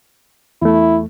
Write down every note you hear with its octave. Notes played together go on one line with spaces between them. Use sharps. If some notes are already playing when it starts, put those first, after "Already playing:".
E2 A3 E4